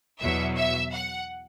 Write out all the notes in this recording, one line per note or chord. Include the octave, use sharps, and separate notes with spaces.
E2 B2 F#3 E5
E5
F#5